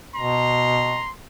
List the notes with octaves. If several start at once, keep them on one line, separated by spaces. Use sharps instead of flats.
B2 A#5 C6